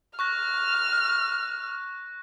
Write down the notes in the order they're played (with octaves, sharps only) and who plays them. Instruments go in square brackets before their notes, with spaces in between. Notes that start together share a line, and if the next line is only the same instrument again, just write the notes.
[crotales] C#6 F#6 A#6 [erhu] F6